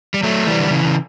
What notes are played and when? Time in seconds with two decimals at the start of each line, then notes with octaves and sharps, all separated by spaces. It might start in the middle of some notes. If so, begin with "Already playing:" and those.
0.14 G3
0.23 F#3 A3
0.47 E3 G3
0.59 D3
0.70 C#3 E3
0.85 C#3